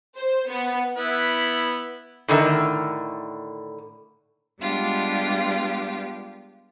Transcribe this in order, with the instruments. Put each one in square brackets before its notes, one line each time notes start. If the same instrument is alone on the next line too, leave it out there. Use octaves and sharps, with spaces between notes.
[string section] C5
B3
[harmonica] B3 E4 B4
[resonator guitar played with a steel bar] A2 D3 D#3 A#4 E5
[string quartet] G3 G#3 B3 D4 F4 G4